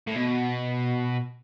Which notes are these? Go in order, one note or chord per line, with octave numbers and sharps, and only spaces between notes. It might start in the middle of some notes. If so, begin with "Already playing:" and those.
A2
B2